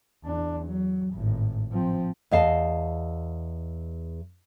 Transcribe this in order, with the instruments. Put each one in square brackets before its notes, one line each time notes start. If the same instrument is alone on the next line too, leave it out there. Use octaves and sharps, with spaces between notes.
[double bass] E2 D4
F#3
G#1 A2
F3 C4
[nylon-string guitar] E2 D#5 F5 A5